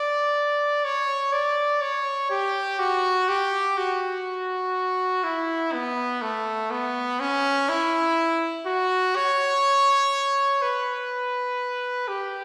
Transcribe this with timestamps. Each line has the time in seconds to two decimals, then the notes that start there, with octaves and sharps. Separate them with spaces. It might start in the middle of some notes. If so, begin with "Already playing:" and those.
Already playing: D5
0.84 C#5
1.33 D5
1.82 C#5
2.30 G4
2.79 F#4
3.29 G4
3.77 F#4
5.24 E4
5.73 B3
6.22 A3
6.71 B3
7.20 C#4
7.69 E4
8.66 F#4
9.15 C#5
10.62 B4
12.08 G4